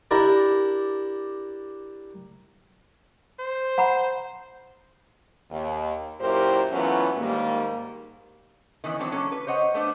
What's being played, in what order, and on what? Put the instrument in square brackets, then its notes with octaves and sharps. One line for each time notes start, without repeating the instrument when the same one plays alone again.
[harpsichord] D4 E4 G4 A#4 D5
[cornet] C5
[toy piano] F#5 A#5 B5
[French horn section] D#2
F#2 A#2 E4 G4 A#4 C5
E3 F#3 A3 B3 C#4 F4
G#2 D#3 G3 A#3
[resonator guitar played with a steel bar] D#3 E3 B3 C#4
E3 F#3 G#3 C4 D4
F#3 A#3 C#4 A4
B4
C5 C#5 D#5 F#5
A3 B3 D4 C5